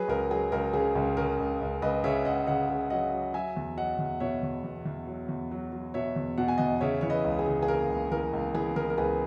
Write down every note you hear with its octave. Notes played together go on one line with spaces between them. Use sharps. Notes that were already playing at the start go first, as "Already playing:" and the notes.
Already playing: F#3 G#4 B4
C#2 A#4
F#3 G#4
C#2 A#4
C#3 G#4
C#2
C#3 A#4
C#2
C#2
C#2 B4 D#5
C#3 C#5 E5
C#2 D#5 F#5
C#3 D#5 F#5
C#3
F#3 D#5 F#5
F#3
F#3 E5 G#5
E2
F#3 D#5 F#5
E2
B2 C#5 E5
E2
E2
E2
F#3
E2
F#3
F#3
B2 C#5 E5
E2
B2 F#5
G#5
E2 D#5 F#5
C#3 C#5 E5
E3 C#5
B4 D#5
C#2
G#4
C#3
G#4
A#3 A#4
C#2
E3 A#4
C#2
E3 G#4
E3 A#4
A#4
C#2 G#4 B4